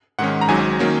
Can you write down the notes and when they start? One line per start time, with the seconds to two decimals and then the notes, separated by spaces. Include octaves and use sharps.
0.19 G#2 D#3 G#3 C#4 F#5
0.41 A#5
0.48 G#1 G#2 F#3 G#5
0.79 D#3 F#3 A#3 C#4